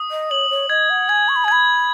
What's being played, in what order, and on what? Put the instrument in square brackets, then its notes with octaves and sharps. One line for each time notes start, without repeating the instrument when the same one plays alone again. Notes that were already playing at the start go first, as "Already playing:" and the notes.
Already playing: [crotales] D#6
[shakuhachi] D#5
[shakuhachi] C#5 [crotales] F#7
[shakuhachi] C#5
[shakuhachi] D#5 [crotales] G#6
[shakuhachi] F#5
[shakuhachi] G#5 [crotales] G#6
[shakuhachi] C#6
B5
G#5
[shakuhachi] B5 [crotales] G#6